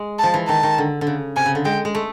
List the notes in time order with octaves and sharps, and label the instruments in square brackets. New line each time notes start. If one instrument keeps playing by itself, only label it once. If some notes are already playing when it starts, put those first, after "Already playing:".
Already playing: [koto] G#3
[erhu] A5
[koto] F3
E3
[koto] D#3 [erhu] A5
[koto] D#3
D3
D3
C#3
[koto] C3 [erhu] G#5
[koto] C#3
D3
[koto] G#3 [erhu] G5
[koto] G#3
A3